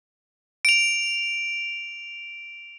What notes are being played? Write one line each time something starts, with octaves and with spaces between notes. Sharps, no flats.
D7 F7